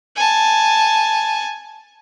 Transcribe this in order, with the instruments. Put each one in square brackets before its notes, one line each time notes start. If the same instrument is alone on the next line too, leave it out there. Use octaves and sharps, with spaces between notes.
[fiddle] G#5 A5